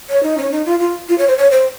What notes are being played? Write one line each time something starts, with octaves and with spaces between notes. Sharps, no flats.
C#5
D#4
C#4
D#4
F4
F4
F4
C#5
C5
C#5
C5